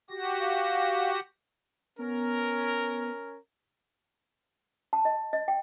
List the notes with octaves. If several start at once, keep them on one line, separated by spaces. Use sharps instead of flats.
F#4 G4 A#6
F5
B3 C#4 A#4
A5
D#5
D#5
G5